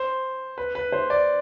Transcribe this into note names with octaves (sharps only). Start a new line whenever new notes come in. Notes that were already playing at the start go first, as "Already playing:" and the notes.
Already playing: C5
B4
B4
C5
D5